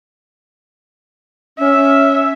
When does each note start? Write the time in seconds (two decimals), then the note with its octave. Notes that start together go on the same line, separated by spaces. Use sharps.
1.59 C#4 E5